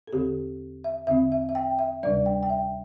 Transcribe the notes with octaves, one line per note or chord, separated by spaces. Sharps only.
A4
E2 D3 C4 G4
E5
E2 D3 C4 E5
E5
E5
G5
E5
D2 C3 G3 D4 D5
G5
G5
E5